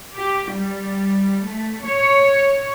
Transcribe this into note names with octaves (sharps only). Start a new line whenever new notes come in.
G4
G3
A3
C#5